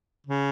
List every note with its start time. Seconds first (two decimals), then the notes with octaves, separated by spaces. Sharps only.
0.26 C#3